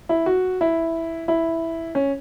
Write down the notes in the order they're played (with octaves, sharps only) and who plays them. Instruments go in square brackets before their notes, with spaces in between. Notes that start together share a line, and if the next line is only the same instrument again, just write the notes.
[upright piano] E4
F#4
E4
E4
C#4